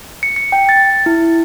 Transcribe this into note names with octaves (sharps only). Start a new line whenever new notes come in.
C#7
C#7
G5
A6
E4